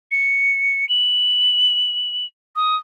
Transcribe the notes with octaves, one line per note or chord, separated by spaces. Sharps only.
C#7
F#7
D#6